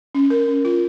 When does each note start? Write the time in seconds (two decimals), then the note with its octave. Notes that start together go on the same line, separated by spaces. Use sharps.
0.15 C#4
0.30 A#4
0.48 C#4
0.65 F4